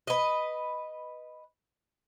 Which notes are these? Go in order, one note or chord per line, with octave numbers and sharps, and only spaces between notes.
B4 D#5